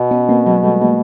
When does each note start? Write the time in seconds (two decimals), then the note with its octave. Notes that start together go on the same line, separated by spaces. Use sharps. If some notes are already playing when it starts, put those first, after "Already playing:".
Already playing: B2
0.11 B3 C#4
0.29 A#3 C4
0.46 F#3 G#3
0.64 G3 A3
0.81 G#3 A#3